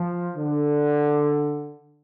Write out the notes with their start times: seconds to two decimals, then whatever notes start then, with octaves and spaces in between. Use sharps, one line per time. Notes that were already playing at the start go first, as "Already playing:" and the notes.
Already playing: F3
0.36 D3